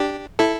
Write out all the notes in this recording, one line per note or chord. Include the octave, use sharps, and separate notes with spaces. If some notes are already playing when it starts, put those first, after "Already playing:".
Already playing: D4 G4
E4 A4